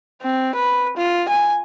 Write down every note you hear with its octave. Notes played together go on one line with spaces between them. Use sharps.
C4
B4
F4
G#5